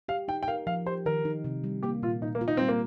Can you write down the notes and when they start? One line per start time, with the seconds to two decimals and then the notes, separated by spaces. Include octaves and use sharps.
0.08 G4 F5
0.28 D#4 G5
0.43 G5
0.48 A#4 F5
0.67 F3 F5
0.86 G4 C5
1.06 D#3 A#4
1.25 D#4
1.44 C3
1.64 G3
1.83 A#3 G4
2.02 A#2 F4
2.22 A#2 D#4
2.35 A#3
2.41 F4
2.48 D#4
2.57 G3 C4
2.69 A#3